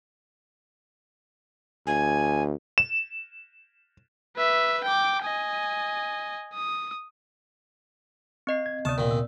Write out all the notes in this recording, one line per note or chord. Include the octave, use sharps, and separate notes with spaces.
D2 G#5
E7
B4 E5
G5 D6
D#5 G#5
D#6
C4 D#5 C7
G#6
D2 C3 B3 C4 D5 A5 D#6
A#2 D#3
E6